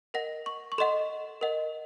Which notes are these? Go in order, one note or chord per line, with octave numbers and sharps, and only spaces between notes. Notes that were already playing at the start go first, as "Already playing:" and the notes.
A#4 D#5 F#5 A#6
C#6
C#6
A4 D#5 F#5 C6
A#4 D#5 F#5